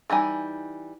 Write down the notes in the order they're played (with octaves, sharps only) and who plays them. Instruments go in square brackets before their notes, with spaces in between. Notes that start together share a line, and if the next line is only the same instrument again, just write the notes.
[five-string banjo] E3 G3 D#4 G#5